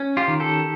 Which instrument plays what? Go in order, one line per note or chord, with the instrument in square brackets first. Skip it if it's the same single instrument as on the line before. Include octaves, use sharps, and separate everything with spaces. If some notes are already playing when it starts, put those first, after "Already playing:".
Already playing: [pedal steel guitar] C#4
F4 G4
D#3
G4 A4